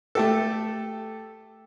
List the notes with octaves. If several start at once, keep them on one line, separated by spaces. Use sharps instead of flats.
A3 G4 A4